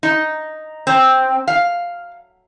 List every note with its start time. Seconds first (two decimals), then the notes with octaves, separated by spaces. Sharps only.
0.03 D#4
0.87 C4
1.48 F5